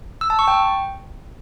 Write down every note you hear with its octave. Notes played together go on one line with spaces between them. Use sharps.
E6
A5
C#6
G5